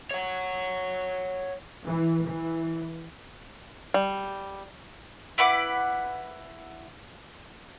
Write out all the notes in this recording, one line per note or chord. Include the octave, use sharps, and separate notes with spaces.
C#5 F#5
E3
E3
G3
E4 B4 F#5 D6